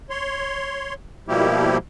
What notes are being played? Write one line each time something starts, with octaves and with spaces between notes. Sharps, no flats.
C#5 C6
B2 F3 G3 A#3 E4 G4